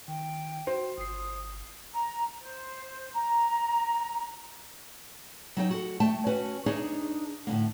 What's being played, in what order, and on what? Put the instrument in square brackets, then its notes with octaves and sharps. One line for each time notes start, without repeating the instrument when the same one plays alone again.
[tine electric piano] D#3 [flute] G5
[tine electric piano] F#4 [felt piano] C5
[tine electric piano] G1 C7 [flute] D#6
[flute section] A#5
C5
A#5
[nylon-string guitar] F#3 D#4 G5
F#4 A4
A3 G5 A5
C#4 F#4 B4
D4 D#4 G#4 C#5
A2 D3 A#3